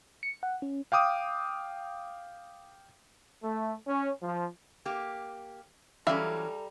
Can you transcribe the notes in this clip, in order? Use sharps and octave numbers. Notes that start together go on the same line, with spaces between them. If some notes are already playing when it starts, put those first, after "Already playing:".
C#7
F#5
C#4
F5 G5 D6 D#6
A3
C#4
F3
A#3 G4
E3 F#3 G3 C#4 A4 E5 F5 A#5